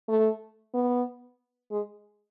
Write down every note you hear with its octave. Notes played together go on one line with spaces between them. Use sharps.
A3
B3
G#3